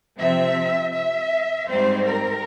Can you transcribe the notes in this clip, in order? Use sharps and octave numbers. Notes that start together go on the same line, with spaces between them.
C3 F3 C4 E5
E5
G#2 G3 C4 C5
A#4